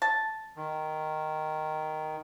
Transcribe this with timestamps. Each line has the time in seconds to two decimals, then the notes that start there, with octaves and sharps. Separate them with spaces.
0.02 A5
0.57 D#3